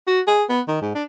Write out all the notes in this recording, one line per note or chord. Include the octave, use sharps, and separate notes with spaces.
F#4
G#4
B3
D#3
G#2
D4